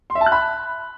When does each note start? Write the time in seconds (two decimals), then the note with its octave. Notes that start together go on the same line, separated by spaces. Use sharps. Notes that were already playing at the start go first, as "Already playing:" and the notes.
0.10 C6
0.15 E5
0.21 A5
0.26 F#6
0.32 B5